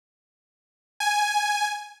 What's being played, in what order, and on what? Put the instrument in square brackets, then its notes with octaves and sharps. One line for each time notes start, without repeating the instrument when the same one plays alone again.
[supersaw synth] G#5